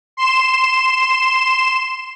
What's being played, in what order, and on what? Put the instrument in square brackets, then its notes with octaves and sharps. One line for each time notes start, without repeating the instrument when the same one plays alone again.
[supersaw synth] C6 E7